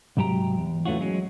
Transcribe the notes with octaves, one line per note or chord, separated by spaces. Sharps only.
C2 G#2 F#3 G4 G5 A#5
E2
E3 A3 C4 C#4 F4 F#4
F#3 G#3 C#4